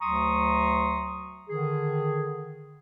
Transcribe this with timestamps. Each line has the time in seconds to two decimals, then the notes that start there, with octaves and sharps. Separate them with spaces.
0.01 D2 F#3 A#5 C6 C#6 D#6
1.49 D3 D#3 G#4